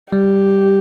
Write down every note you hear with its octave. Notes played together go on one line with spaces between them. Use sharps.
G3 G4